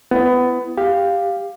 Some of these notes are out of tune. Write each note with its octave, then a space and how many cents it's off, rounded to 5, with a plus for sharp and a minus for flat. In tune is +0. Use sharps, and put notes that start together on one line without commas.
B3 +20 E4 +25
G4 +15 F5 +0